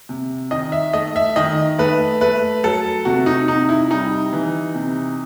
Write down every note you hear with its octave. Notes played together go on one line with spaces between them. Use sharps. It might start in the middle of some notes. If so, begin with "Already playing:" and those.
C3
D#3 D#5
E5
A3 D#5
E5
D#3 D#5
A3 B4
A3 B4
F#3 A4
C3 F#4
D#4
C3 D#4
E4
G3 D#4
E3
C3